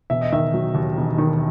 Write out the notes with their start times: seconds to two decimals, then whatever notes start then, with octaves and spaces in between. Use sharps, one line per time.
0.10 E1 E5
0.21 D#5
0.32 D#3 E5
0.54 F#3
0.75 D#2
0.97 E1
1.18 D#3